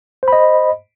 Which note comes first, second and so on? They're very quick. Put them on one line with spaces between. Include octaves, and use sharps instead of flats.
C5 B5 D#5